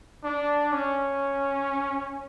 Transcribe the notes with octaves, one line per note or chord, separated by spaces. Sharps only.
D4
C#4